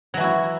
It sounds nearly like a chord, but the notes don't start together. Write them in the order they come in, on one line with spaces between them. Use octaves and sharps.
F#3 E3 F#4 E4